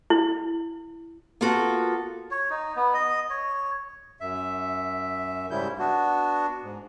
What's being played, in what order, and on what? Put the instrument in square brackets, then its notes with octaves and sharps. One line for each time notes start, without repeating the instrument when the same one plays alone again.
[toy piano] E4
[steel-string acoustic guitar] A#3 B3 F4 F#4 A4
[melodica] C#5
D#4
B3
D#5
C#5
[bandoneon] F#2 E5
G#2 C#3 G3 E4 G6
B3 D4 F#4
G#2